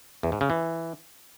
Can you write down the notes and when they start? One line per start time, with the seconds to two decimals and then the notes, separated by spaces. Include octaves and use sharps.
0.23 E2
0.32 G#2
0.41 C#3
0.50 E3